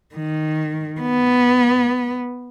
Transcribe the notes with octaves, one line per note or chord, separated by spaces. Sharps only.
D#3
B3